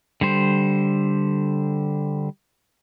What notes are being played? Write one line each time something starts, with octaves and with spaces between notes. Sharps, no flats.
D3 G3 C5